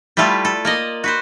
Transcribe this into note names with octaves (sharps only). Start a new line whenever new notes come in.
G3 A3 E4 F4 A4
A4
A#3 D5 D#5
F#4 B4 C5